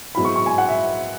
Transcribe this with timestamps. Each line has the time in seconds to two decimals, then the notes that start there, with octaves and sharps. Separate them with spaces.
0.15 G#2 F#3 B3 E4 B5
0.25 C#6
0.36 C#6
0.46 G#5
0.58 F#5
0.68 E5